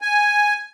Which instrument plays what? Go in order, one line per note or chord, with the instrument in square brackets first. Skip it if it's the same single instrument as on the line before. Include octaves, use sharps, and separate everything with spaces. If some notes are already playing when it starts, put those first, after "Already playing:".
[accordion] G#5